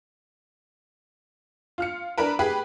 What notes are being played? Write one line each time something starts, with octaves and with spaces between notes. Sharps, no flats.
F4 F6 C#7
D4 E4 A#4 B4
G4 G#4 B4